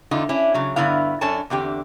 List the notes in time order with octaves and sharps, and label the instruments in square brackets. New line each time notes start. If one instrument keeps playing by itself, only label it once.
[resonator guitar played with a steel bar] E2 D3 D#4 F4
C#4 D4 E4
C#3 F#3
G2 D3 B3 E4 F5
F#2 D4 A4 C#5 G#5 A5
E2 D3 C4 G4